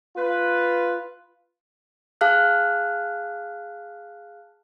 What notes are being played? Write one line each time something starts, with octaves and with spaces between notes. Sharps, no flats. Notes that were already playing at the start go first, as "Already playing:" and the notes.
F4 B4
G#4 F5 A5 F6 F#6